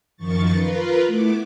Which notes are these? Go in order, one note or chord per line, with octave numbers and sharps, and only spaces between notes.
F#2 D#3 F3 C#6 A6
F4 A#4 B4
A3 B3 E4 D6